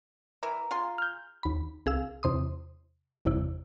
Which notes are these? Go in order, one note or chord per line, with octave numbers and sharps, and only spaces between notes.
E3 E4 A#4 A#5
F4 G#4 C6
F6 G6
D#2 B5
C2 G#4 F5 E6
E2 C3 C6 D#6
G1 E2 C3 E4